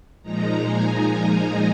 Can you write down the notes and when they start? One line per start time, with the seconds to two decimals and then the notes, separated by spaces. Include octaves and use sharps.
0.23 A#2 F3 G#3 D#4 A#5
0.63 G#5
1.03 G#5